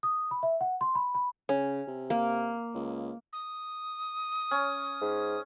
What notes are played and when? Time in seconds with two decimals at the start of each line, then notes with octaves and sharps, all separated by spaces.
0.03 D#6
0.31 B5
0.43 E5
0.61 F#5
0.81 C6
0.95 B5
1.15 B5
1.49 C#3 C#4
1.87 C3
2.10 A#3
2.75 C#2
3.33 D#6
4.51 C#4
5.01 G#2